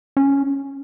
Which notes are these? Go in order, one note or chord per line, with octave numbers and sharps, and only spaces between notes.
C#4